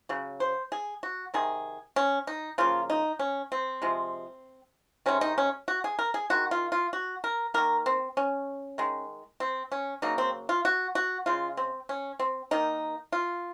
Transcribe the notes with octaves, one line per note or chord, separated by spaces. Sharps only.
C#3 F#3
C5
G#4
F#4
C3 D#3 G#4
C#4
D#4
C#3 F3 A#3 F4
D#4
C#4
C4
C3 F3 G#3
C3 D#3 G#3 C#4
D#4
C#4
F#4
G#4
A#4
G#4
D#3 G#3 F#4
F4
F4
F#4
A#4
D#3 A#3 A#4
C4
C#4
D#3 G#3
C4
C#4
C#3 F#3 A#3 D#4
C4
F4
F#4
F#4
C#3 G#3 F4
C4
C#4
C4
D#3 A#3 D#4
F4